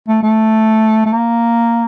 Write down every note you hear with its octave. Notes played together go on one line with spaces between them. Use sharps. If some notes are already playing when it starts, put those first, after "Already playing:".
A3
A3
A3
A#3